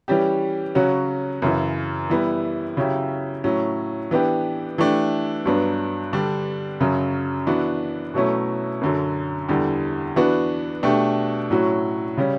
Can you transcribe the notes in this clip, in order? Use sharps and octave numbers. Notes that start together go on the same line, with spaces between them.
E3 G3 C#4 G4
C#3 F#3 C#4 F#4
F#2 C#3 E3
E3 G3 B3 E4
C#3 F#3 C#4 E4 G4
A2 F#3 C#4
E3 B3 D4 G4
E3 A3 D4 G4
G2 F#3 B3 D4
D3 G3 D4
F#2 C#3 F#3
E3 B3 D4 F#4
B2 F#3 A3 C#4 E4
F#2 D3 F#3
E2 D3 G3
E3 B3 D4 F#4
B2 A3 D4 G4
A2 F#3 C#4 F#4
C#3 G3 C#4